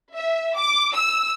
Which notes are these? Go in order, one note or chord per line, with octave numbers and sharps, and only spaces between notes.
E5
D6
E6